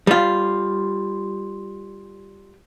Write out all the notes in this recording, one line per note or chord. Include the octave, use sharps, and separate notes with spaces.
G3 F4